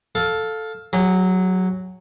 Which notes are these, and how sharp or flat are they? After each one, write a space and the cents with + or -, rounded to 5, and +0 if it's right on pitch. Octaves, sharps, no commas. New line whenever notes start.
A4 +0 F5 +15
F#3 +0 G#4 -35